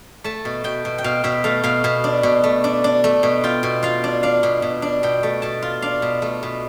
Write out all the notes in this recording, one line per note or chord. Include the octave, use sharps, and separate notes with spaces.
A3 A5
B2
B2 G5
B2
G5
B2 F5
B2 E5
A3 F5
B2 F5
B2
D4
B2
A3
D4
D4
A3
B2
F4 G5
B2
F4 F5
D4
D4 F5
B2
B2
D4
B2 G5
A3
B2 A5
F4
D4 F5
B2
A3
B2